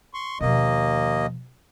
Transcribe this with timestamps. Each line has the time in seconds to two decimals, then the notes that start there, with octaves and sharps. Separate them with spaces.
0.14 C6 C#6
0.41 D#2 B2 F3 A#3 D#5